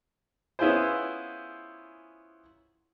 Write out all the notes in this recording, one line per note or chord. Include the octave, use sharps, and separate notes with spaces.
B3 C#4 E4 F4 G#4 C5